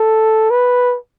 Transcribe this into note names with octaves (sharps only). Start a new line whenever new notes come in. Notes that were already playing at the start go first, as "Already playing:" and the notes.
Already playing: A4
B4